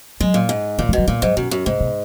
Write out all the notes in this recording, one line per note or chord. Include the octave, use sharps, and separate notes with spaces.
F#3 G#3
A#2
G#2
A#2 E3
E3
B2 F#3
A#2 G#3
G#2 F#3
F#2 B2
F#2
G#2 C#3
B2